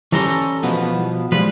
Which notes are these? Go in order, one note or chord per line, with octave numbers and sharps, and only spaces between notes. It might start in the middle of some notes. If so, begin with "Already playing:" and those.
E3 G3 C#4 A4 C5 A#5
B2 F3 B3
F3 G3 G#3 B4